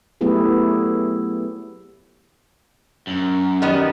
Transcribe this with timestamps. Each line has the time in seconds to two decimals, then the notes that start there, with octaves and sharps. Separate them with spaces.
0.21 F#3 A3 B3 E4 G4 G#4
3.07 F#2
3.62 D#3 G3 B3